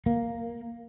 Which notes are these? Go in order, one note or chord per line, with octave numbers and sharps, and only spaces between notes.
A#3